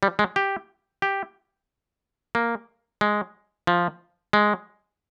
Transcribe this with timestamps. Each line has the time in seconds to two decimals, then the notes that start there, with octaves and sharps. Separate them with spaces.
0.03 G3
0.19 G#3
0.36 G4
1.02 G4
2.35 A#3
3.01 G#3
3.67 F3
4.33 G#3